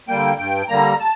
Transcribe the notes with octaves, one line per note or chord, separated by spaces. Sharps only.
D3 G3 A#3 G5
G2 G5
D3 G3 A#3 A#5
A5